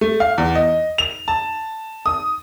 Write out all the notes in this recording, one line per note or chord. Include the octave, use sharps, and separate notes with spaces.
A3
F5
E2
D#5
F7
A5
D#6